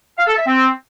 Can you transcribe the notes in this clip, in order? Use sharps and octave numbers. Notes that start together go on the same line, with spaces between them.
F5
A4
E5
C4